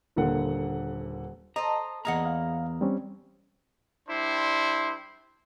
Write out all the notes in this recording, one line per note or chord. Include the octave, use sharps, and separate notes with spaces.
D#1 D3 A#3 F#5
A4 C5 D#5 A#5
E2 A#3 G#4 D#5 F#5 A#5
F5
G3 C4 C#4
G3 D4 E4 C5 C6